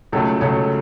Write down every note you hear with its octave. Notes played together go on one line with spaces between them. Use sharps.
C#2 C#3 F#3 A3 A4
C#2 C#3 F#3 A3 C#5